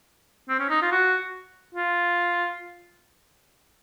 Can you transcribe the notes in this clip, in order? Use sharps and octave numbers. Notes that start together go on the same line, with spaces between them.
C4
C#4
D#4
F4
F#4
F4